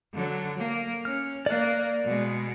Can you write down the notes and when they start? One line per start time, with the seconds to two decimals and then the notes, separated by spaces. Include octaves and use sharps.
0.14 D3 F#3
0.58 A#3
1.05 C#4 F6
1.46 A#3 D5 F#6
2.04 B2 G#3